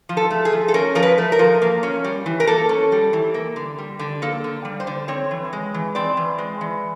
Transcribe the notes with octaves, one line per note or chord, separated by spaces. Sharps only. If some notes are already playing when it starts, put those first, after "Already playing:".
F3
A4
A3
G#4
F3
A4
C#4 A#4
F3 A#4
B4
A3
A#4
F3
A#3
C#4
G3
E3
A#4
A#3 A4
C#4
G3
E3
A#3
D3
G3
D3
A#3 A4
D3
G3
C5
D3
C4 C#5
E3
G#3
E3
C4 D5
E3
G#3
E3